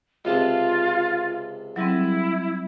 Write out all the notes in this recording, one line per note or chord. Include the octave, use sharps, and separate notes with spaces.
C#2 C3 F4 A5
F#3 G3 C4 E4